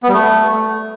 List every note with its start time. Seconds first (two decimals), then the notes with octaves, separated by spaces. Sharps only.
0.03 B3
0.08 G3
0.14 A3